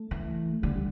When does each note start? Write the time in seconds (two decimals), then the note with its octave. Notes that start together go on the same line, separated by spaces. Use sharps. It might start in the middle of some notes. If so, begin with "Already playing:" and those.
Already playing: A3
0.11 E3
0.62 D3 G3
0.76 G3